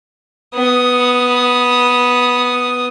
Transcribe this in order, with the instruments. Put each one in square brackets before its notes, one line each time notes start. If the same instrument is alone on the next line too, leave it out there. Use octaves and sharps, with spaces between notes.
[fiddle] B3 D#6